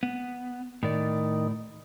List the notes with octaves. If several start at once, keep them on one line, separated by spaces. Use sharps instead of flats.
B3
A2 D#3 D5